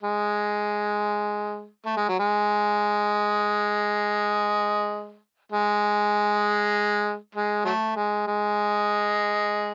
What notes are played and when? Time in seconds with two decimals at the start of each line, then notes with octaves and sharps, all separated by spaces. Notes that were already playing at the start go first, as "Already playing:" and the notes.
0.03 G#3
1.85 A3
1.97 G#3
2.09 F#3
2.19 G#3
5.52 G#3
7.35 G#3
7.65 F#3 A3
7.96 G#3
8.27 G#3